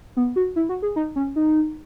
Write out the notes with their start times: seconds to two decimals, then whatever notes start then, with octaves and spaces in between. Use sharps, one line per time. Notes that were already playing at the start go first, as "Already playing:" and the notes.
0.17 B3
0.36 F#4
0.56 E4
0.69 F#4
0.82 G#4
0.96 D#4
1.16 C#4
1.36 D#4